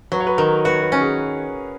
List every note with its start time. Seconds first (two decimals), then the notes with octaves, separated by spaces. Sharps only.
0.12 F#3 B4
0.20 C#5
0.27 B4
0.38 D#3 A#4
0.65 F#4 B4
0.82 B4
0.92 C#4
1.01 G#4